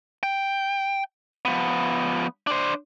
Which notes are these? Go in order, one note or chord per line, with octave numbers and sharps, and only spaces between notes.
G5
F3 B3
D4 C5